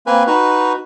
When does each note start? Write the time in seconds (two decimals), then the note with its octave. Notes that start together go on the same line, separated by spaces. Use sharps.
0.07 A#3 C4 B4 G#5
0.27 D#4 F#4 B4